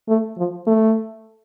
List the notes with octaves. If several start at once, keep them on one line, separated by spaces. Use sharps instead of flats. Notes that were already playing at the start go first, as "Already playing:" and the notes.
A3
F3
A3